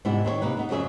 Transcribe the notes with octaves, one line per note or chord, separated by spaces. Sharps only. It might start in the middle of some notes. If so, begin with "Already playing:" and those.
G#2 C3 G3 B3 E4
D#3 C4 G#4 C#5
C3 A#3 D#4 B4
B3 D#4
F2 C#3 F#3 G#4 E5